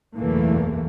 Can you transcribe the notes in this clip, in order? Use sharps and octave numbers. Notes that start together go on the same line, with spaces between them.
F#1 B1 E2 E3 A3 A#3